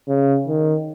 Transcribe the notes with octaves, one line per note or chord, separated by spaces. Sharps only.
C#3
D#3